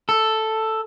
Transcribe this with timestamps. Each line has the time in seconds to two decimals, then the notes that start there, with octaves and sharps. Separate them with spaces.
0.09 A4